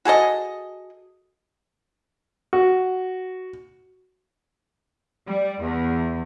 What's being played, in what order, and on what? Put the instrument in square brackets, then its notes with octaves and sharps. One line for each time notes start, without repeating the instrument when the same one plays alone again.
[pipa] F#4 G#4 A4 D#5
[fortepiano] F#4
[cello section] G3
E2